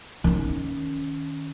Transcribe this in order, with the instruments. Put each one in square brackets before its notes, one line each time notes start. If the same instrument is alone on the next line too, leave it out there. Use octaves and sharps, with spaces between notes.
[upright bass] D#3 C#4